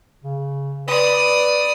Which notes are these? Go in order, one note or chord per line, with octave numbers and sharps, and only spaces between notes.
C#3
B4 D5 D#6